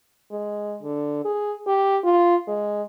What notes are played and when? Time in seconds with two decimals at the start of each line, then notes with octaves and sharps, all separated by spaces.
0.32 G#3
0.82 D3
1.25 G#4
1.67 G4
2.04 F4
2.47 G#3